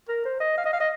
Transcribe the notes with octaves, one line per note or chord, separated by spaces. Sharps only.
A#4
C5
D#5
F5
D#5
F5
D#5